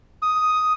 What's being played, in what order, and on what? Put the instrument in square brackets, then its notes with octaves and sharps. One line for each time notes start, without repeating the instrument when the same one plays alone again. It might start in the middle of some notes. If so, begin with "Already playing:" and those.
[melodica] D#6